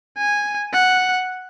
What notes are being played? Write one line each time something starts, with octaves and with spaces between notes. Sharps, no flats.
G#5
F#5